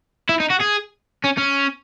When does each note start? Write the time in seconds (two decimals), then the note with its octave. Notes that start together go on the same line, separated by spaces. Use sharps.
0.29 E4
0.40 D#4
0.50 F#4
0.60 G#4
1.24 C#4
1.38 C#4